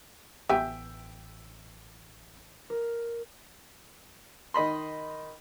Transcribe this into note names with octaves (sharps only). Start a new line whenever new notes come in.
A1 B3 G4 E5 G5 G#5
A#4
D#3 D#5 B5 C6